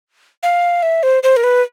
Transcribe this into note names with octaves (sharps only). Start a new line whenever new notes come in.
F5
E5
C5
C5
A#4
B4